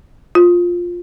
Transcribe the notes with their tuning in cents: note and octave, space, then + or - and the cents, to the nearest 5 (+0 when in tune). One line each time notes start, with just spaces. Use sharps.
F4 +5